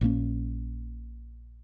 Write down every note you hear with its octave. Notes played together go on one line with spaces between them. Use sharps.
A#1 A#2 A#3 C#4